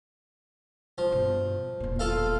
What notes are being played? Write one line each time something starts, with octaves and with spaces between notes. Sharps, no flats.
F3
G2 B2
E1 A#2
F4 A4 F5